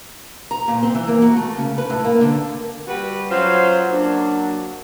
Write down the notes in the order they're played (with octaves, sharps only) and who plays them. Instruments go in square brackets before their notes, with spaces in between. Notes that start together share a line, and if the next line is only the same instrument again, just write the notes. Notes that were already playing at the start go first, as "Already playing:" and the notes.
[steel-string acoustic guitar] A#5
A#2
C4
E3
A#3
F#4
A3
C#3
B4
A2
A#3
D3
[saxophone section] G3 F#4 B4
F#3 C#4 F4 C5
F#3 A#3 D4